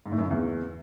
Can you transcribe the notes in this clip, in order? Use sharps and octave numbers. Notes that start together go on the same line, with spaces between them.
G#2
A2
F#2
C#3
E2